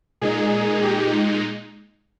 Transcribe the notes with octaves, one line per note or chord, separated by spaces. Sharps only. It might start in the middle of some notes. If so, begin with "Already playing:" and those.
A#2 G#3 D#4 G#4
G4